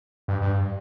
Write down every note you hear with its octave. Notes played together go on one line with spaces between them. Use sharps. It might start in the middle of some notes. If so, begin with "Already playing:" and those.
G2
G2